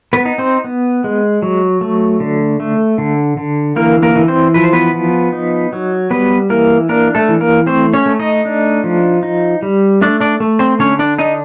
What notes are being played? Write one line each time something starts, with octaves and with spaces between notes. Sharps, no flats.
B3 B4
D#4
C4 C5
B3
G#3
F#3
A3
D3
A3
D3
D3
E3 A#3 A#4
A#3 A#4
E3
C4 C5
F3 B4
C5
B3 B4
F3
D#4
F#3
G3 B3 B4
E3 A#3 A#4
A#3 D4 A#4
A3 A4
E3
A#3 A#4
A3 C4 C5
C#4 C#5
A3
D#4 D#5
D4
F3
D#4
G3
A3 D4 D5
D4 D5
A3
C4 C5
D3 C#4 C#5
D4 D5
D4 D#4 D#5